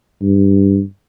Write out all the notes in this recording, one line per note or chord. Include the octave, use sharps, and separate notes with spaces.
G2